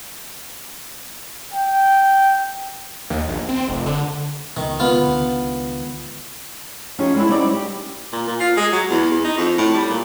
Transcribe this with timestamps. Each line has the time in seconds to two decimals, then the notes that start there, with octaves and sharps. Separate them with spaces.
1.54 G5
3.10 D#2
3.29 A#1
3.49 C4
3.68 F1
3.86 D3
4.57 C#2 B2 D#3
4.80 B3 F4
5.01 C#2 D3 D#3
6.98 F3 C#4 D#4 G4 G#4
7.15 G3 G#3 B3 C4 E4
7.29 G3 C4 C#4 D#4 D5
7.54 G4
8.13 A#2
8.27 A#2
8.40 F4
8.57 G#3
8.72 F#3
8.90 E2
9.11 E2
9.24 D#4
9.38 F2
9.58 A2
9.74 G3
9.90 A#2